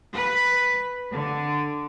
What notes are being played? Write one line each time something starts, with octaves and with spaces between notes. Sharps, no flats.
B4
D3